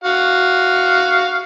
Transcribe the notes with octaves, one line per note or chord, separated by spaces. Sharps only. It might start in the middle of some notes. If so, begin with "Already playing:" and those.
F#4 F5